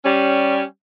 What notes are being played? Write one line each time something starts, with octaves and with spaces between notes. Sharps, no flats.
G3 C#4